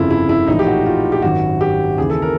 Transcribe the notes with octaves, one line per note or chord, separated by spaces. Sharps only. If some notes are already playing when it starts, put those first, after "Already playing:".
Already playing: G1 F2 C#3 E4 F4
E4
E4
A#1 A2 E3 D#4
G4
F#4
F4
G4
G#1 F#2 D#3 F#4
G4
D#2 C#3 E3 G#4
A4
A#4